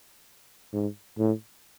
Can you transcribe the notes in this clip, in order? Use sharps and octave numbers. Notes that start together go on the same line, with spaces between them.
G#2
A2